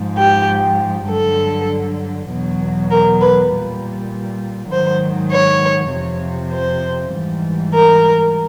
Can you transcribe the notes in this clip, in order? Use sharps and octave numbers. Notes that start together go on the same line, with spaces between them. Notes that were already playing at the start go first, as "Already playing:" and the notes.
Already playing: G#2 F3
G4
G2 D3 F#3 A4
E2 B2 F#3
A#4
B4
A#2 G3
G#2 D#3 F#3 C5
C#5
F2 C3 F3
C5
G#2 E3 G3
A#4